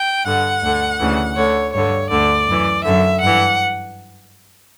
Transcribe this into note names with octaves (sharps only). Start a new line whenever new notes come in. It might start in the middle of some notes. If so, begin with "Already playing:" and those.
Already playing: G5
G2 D3 F#5
D2 D3
D2 C#3 E3
D2 D3 C#5
G2 D3 C#5
D2 D3 D5
F#2 E3
F#2 D3 E5
G2 E3 F#5